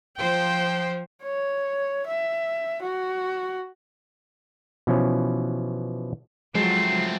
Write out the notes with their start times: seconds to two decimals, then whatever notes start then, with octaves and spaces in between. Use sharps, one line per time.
0.18 F3 C5 G5
1.23 C#5
2.07 E5
2.82 F#4
4.87 B2 E3 F3 C#4
6.55 F3 F#3 G#3 A3 C4 F4 C7